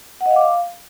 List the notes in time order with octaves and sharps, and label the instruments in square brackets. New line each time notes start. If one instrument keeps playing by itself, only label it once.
[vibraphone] F#5
D#5
F5
D6
F5